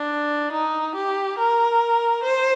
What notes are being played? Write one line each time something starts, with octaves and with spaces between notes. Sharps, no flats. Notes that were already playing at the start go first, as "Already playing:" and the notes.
Already playing: D4
D#4
G4
A#4
C5